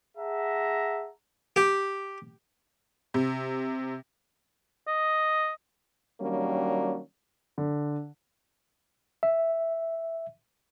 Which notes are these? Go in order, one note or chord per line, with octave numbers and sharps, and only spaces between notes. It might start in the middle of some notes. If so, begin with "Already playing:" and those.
G#4 E5 F#5 A5 A#5
G4
C3
D#5
D#3 F#3 G3 A#3 C#4 D4
D3
E5